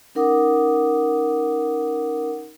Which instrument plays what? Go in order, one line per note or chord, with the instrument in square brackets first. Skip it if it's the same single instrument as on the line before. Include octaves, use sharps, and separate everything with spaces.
[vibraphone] C#4 D#4 A#4 F#5 D6 D#6